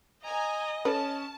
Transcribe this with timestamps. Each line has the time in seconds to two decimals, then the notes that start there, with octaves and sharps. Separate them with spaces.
0.25 D#5 G#5 A#5
0.85 C#4 A4 B4 A5